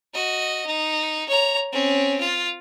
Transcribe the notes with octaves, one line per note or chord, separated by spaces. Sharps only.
F#4 D#5
D#4
C#5 A#5
C4 C#4
F4